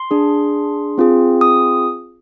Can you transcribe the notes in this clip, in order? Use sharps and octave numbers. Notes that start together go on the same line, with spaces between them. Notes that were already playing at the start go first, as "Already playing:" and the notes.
Already playing: C6
D4 G#4
C4 F4 G#4
D#6